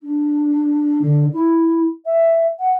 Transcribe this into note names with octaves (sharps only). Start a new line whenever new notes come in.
D4
D3
E4
E5
F#5